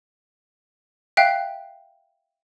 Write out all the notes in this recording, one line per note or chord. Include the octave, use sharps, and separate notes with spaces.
E5 F5 G5 F#6